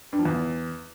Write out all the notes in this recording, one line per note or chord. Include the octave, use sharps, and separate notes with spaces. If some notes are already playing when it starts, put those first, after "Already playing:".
G2
F3
E2